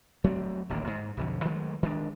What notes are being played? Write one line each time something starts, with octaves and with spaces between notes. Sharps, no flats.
F#3 A3 A#3 C4
D1 A1 D#3 A#3
G#2
B1 F2 D3
D#3 F#3 G#3 A3
D#3 G#3 D4